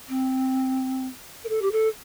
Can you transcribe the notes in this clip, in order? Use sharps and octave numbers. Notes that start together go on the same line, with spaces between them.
C4
A#4
A4
G4
A4